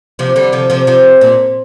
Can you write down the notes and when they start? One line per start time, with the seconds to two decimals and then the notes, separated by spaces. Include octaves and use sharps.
0.19 C3 F3
0.36 D3 G3
0.52 C3 F3
0.70 C3 F3
0.87 C3 F3
1.21 A#2